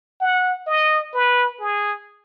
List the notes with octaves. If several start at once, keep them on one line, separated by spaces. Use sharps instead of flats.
F#5
D#5
B4
G#4